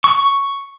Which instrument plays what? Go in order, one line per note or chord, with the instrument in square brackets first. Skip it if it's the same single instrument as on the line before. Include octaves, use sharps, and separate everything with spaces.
[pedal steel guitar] C#6